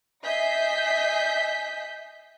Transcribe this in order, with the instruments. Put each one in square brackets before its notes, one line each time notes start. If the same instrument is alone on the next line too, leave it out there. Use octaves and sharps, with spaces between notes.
[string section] D#5 E5 G#5 G6 B6 C7